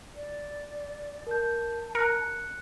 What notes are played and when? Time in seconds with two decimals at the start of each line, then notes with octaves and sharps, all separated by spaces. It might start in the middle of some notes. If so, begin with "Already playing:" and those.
0.15 D5
1.27 A#4 A5 G6
1.95 A#4 F#6 C#7